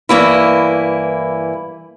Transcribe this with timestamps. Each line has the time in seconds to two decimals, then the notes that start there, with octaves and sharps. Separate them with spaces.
0.09 G2 E3 A#3 E4